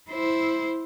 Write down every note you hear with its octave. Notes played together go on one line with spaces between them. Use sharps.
E4 C5